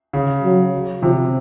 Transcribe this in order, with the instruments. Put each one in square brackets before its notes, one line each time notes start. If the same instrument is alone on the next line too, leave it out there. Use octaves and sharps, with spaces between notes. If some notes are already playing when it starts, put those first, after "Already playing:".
[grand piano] C#3
[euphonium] F#3
[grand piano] C3 [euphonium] F3